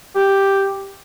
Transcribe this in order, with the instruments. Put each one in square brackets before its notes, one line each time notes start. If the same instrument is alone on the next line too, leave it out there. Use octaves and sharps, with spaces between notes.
[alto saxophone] G4